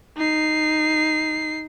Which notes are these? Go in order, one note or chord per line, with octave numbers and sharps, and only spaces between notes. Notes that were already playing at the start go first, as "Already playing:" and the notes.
D#4 C7